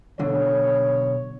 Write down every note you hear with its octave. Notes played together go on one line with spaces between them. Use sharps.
B1 D3 C#5